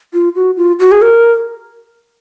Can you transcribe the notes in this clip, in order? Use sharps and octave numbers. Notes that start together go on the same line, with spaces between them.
F4
F#4
F4
F#4
G#4
A#4